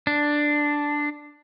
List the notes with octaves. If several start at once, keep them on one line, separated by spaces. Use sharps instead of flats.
D4